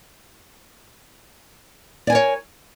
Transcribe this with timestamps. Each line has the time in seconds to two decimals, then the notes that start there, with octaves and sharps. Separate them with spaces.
2.07 D5
2.10 G#5
2.12 A#4
2.15 C#5